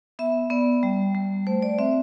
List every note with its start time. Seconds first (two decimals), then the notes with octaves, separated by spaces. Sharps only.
0.19 B3 E5
0.50 B3 D5
0.83 G3
1.15 G3
1.47 A3 C5
1.62 D5
1.79 C4 E5